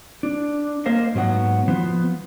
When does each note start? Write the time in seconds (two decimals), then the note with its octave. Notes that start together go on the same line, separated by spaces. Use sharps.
0.23 D4
0.86 A#3 A#4 C5 D#5 F5
1.15 G#2 F#3 B3 F#5
1.68 F3 B3 C5